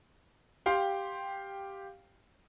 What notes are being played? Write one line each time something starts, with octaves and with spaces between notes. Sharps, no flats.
G4 F5 G5 C6